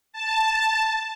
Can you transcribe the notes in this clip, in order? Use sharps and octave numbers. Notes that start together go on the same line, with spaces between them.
A5